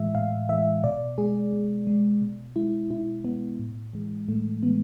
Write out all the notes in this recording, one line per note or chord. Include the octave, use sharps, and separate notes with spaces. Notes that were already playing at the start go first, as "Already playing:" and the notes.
Already playing: A2 E3 G#3 E5
A2 F5
E3 G#3 E5
B2 D5
G#3 G#4
B2
G#3
B2
G#3 E4
B2 E4
G#3 B3
A2
E3 G#3
A2 A3
E3 G#3 B3